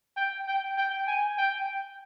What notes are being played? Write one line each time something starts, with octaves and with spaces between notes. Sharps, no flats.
G5
G5
G5
G#5
G5